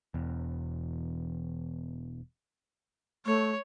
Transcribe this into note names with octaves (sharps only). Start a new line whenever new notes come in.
E1 E2
A3 C#5